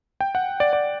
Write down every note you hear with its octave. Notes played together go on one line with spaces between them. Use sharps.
G5
F#5
D5
D5